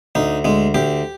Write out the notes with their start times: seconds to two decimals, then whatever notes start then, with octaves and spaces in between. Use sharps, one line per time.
0.15 D2 D#4
0.45 D2 G#3
0.74 D2 G4